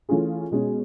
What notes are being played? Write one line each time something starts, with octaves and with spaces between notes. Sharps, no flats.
E3 A3 C#4 F4 G#4
B2 G#3 C#4